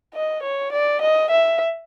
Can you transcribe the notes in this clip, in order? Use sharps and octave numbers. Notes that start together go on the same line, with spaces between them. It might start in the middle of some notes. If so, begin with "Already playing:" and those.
D#5
C#5
D5
D#5
E5